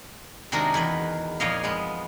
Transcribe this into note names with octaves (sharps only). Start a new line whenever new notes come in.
C3 D#3 G#3 D4 F#4 A#4
E2 D#3 B4
F2 A#2 F3 C#5 D#5 F5
G#3 B3